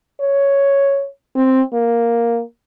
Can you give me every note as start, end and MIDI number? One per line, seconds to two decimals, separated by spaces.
0.20 1.06 73
1.36 1.61 60
1.73 2.41 58